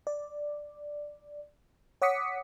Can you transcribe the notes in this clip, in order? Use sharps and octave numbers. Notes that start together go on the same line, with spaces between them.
D5
C#5 F#5 D6 D#6 B6 C#7